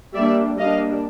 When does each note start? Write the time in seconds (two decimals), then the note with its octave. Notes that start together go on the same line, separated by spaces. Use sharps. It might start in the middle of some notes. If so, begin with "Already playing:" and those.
0.14 G3 A#3 D4 D5 E5
0.58 G3 A#3 D4 D#5 F5